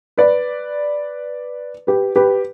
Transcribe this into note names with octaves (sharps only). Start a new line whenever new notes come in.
B4 D5
G4 B4
G4 B4